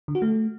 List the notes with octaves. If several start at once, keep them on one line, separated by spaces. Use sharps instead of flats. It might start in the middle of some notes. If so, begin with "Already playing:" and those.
D3
F#4
A3